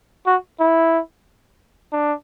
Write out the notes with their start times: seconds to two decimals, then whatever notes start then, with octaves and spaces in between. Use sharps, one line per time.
0.26 F#4
0.60 E4
1.92 D4